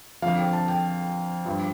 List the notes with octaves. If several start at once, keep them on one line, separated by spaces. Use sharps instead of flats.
F2 D3 F3 F5
G5
A5
G5
G2 F3